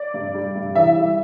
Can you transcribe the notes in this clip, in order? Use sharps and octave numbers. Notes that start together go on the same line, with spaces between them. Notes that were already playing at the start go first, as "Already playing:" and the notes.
Already playing: D5
G2
G3
G2
E3 E5
G3